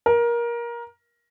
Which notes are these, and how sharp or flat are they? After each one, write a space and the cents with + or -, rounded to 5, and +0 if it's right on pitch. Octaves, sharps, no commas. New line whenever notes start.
A#4 +20